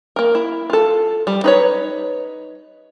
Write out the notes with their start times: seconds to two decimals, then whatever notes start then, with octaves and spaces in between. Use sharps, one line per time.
0.16 A#3 A#4
0.35 E4
0.70 F4 A4
1.27 G3
1.44 D#4 B4 C#5